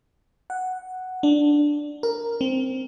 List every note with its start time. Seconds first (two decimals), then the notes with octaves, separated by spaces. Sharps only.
0.50 F#5
1.23 D4
2.03 A#4
2.41 C4